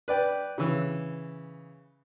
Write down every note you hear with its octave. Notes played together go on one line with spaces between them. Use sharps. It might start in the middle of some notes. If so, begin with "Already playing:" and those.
B4 D5 G5
C#3 E3